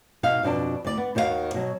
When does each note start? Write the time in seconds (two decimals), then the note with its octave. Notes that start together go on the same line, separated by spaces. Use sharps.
0.23 B2 D#4 F5
0.43 F2 B2 D4 D5 A5
0.85 D2 D5
0.97 B3
1.15 D#2 D#3 F#4 G#4 F5
1.54 B2 F#3